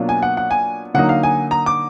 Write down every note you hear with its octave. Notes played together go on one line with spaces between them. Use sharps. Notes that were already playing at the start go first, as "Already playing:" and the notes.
Already playing: B2 F#3 A#3 D4 F4
G#5
F#5
F#5
G#5
D3 F#3 A#3 D#4 F#5
F5
G#5
A#5
D6